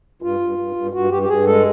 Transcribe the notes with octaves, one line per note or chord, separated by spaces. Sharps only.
G2 F4
G2
G2
G2
G2 F#4
G2 G4
G4
G2 G#4
G#3 A4